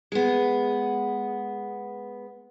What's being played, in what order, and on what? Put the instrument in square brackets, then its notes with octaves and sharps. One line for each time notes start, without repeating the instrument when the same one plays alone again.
[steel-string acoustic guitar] G#3 B3